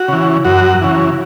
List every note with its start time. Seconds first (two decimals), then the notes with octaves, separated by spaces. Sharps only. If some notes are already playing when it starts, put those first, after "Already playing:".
Already playing: F#4
0.08 C#3 E3
0.45 F#2 F#4
0.81 C#3 E3